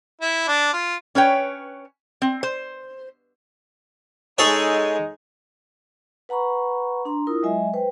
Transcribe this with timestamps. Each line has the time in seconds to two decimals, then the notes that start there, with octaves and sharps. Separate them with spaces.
0.21 E4
0.48 D4
0.73 F4
1.15 C#4 B4 C#5 G5
2.22 C4
2.43 C5
4.38 G#3 D#4 G#4 A4 C#5
6.29 B4 F#5 A#5 B5 C#6
7.05 D4 A#5 C6
7.27 E4 F4 A#4 D#6
7.43 F#3 G#3 D#5 E5 G#5
7.74 B4 C5 G5